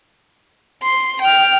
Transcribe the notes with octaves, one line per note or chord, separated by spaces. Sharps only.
C6
G5 F6